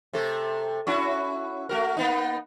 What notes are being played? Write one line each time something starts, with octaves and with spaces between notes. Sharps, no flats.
C3 A3 A4
C#4 E4 F#4
A3 F#4 A#4
A#3 B3 D#4